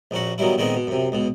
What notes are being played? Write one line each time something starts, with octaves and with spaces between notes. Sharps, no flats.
A#1 A#2 C#4 F#4
B2 D#3 F#3 G3 E4
A#2 D3 D#3 G#3 B3 C4
B2
F#2 C3
C#2 B2